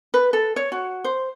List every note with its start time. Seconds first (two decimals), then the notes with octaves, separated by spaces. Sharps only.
0.14 B4
0.33 A4
0.56 C#5
0.72 F#4
1.04 C5